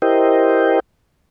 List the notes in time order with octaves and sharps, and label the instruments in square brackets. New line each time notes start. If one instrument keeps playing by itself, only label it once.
[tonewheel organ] E4 G4 A#4 C5 D#5 G5